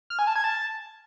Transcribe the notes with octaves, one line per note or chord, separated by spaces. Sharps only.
F6
G#5
A5
G#6
A5